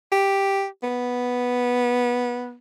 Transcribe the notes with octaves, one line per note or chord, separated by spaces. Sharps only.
G4
B3